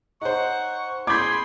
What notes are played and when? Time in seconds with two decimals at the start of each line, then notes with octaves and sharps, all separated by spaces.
0.21 D#4 C5 F#5 C#6
1.07 G#4 B5 C6 D6 G6 G#6